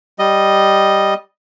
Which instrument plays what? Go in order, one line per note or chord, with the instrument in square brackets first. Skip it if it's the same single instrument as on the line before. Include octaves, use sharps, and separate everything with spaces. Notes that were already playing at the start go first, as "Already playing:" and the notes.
[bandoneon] G3 D#5